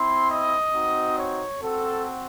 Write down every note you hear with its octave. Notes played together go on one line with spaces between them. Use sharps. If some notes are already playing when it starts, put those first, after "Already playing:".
Already playing: C4 E4 C6
D#5
C4 D#4 F#4
C#5
C4 F#4 A4